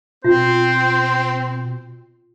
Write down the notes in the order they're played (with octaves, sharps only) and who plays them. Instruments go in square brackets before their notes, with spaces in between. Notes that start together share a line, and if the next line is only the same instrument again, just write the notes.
[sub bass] B2 [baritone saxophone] C4 [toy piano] F4 [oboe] C5